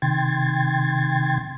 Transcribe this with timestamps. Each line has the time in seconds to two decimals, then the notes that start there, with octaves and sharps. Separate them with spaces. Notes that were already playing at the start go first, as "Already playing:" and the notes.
0.02 C3 D#3 G5 C6 G#6 A6